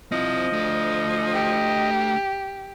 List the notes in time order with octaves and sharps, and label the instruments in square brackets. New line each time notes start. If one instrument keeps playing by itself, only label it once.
[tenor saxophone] F3 [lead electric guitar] C4 E4 [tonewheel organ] D#5
[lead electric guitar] A3 D4
[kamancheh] G4